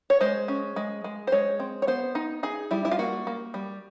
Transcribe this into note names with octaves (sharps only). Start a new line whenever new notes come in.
C#5
G#3 C5
C#4
G#3
G#3
C5
G#3 C#5
C4
C#5
B3 C5
D#4
D#4 G#4
G3 E4
E4
F4
A#3 F#4
A#3
G3